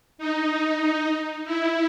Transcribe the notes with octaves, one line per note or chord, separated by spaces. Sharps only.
D#4
E4